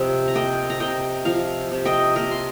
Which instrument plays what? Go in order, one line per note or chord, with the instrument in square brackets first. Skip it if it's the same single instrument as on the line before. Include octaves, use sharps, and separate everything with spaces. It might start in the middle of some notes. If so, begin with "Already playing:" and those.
Already playing: [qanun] C3 F3 C5 D#5
A#5
A#3 D#5 G5
A#5
C3 D#5 G5
F3 F5 A#5
C3
D#5 G5
A#3 A#4 D#5
C6